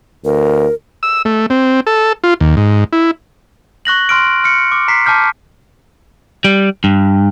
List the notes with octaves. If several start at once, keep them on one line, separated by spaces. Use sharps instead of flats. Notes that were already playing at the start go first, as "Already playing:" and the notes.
D2 A#4
E6
A3
C4
A4
F4
D#2
G#2
E4
C#6 F#6 A#6 F#7
C6 F6 D7
F6 C#7
D6
A#5 B6 C7
A5 D6 F6 G6
G3
G2